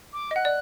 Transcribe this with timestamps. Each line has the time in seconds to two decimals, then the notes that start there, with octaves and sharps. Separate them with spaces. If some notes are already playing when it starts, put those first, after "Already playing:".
0.13 D6
0.31 D#5
0.36 F#5 F#6
0.45 D5